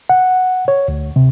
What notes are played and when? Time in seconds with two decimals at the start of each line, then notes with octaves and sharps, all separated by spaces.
0.09 F#5
0.68 C#5
0.88 D2
1.16 C3